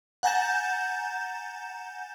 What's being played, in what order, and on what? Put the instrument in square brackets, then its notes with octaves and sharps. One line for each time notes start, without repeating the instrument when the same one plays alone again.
[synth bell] F#5 G#5 A#5 G6 A6 E7